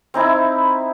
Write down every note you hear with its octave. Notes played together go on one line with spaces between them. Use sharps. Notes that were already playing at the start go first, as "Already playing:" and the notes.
C4 D#4 E4